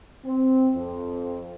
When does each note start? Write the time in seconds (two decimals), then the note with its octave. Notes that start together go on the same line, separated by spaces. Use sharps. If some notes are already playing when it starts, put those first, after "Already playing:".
0.24 C4
0.74 F2